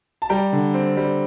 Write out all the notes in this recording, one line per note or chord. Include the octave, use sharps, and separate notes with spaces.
A5
G3 G5 A#5
D3
C4
G3